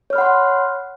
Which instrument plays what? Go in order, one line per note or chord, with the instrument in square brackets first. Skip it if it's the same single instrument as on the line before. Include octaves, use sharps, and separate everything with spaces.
[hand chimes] C#5
F6
B5
F#5
C6